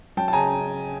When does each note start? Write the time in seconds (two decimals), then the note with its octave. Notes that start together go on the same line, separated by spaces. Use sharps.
0.17 F#3 G5 A5
0.28 A5
0.32 C#3 G#5 A#5